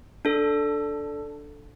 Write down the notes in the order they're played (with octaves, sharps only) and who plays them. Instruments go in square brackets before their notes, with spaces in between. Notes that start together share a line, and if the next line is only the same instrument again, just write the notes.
[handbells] D4 A4